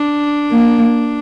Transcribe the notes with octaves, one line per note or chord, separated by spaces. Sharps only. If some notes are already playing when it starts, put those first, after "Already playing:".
Already playing: D4
A#3